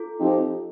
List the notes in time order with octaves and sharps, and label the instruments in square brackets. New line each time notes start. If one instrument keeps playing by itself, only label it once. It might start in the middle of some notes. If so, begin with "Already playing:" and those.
Already playing: [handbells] F4 A4
[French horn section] F3 C4 D#4 G4